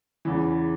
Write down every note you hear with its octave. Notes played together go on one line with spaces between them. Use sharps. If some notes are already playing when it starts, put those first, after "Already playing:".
E2 C#3 E3